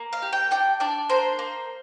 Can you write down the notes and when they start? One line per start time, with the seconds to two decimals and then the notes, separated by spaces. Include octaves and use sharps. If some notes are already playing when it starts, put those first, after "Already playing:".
Already playing: A#3
0.13 F5
0.22 G4
0.33 G5
0.51 D4 G5
0.80 D4 D5
1.10 A#3 C5
1.39 A#3